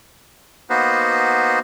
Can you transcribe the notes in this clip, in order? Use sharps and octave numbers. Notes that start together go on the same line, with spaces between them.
A#3 B3 D#4 F#4 B4 C5